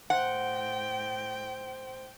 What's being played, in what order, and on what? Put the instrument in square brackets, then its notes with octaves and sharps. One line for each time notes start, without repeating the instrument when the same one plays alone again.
[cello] A2 G5 [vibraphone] C5 C6 [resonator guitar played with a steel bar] F#5